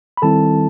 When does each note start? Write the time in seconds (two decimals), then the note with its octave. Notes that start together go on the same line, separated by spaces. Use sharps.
0.17 B5
0.22 D#3 G3 C4 E4 A4 A5